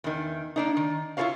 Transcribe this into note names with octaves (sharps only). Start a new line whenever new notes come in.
E2 D#3
A#3 D4 D#4
D#3
E4 F4 A4 A#4 C#5 F5